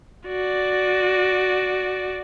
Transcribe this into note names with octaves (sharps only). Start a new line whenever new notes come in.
F#4 D5